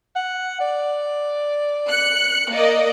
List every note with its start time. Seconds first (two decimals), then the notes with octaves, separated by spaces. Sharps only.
0.16 F#5
0.60 D5
1.90 F#6 C#7
2.51 A#3 D5 D#5